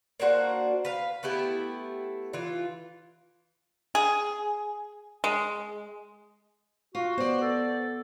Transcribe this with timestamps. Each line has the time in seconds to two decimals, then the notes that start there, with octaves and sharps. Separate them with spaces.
0.20 A#3 D4 F#4 C5
0.85 B4 F5
1.23 A3 B3 E4 G4
2.33 E3 F4
3.95 G#4
5.24 G#3
6.95 F4 F#4
7.18 B3 C5 D5
7.42 A4